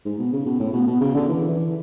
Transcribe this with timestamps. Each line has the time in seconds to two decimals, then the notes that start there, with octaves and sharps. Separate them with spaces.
0.06 G#2
0.19 B2
0.33 C#3
0.46 B2
0.60 A2
0.73 B2
0.87 B2
1.00 C#3
1.14 D3
1.29 E3
1.49 E3